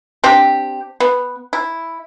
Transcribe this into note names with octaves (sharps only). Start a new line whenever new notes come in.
C4 D4 G4
B3
E4